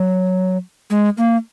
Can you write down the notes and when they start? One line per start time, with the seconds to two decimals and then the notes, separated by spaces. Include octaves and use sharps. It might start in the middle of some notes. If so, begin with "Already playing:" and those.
Already playing: F#3
0.90 G#3
1.17 A#3